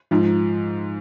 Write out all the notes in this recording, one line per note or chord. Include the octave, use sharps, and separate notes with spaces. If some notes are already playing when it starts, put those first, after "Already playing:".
G#2 F3